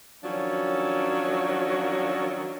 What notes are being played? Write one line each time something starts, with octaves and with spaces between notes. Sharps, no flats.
D#3 F3 F#3 C#4 D4